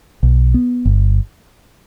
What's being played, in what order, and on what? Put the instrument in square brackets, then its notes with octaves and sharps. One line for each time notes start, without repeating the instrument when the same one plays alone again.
[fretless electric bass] B1
B3
G1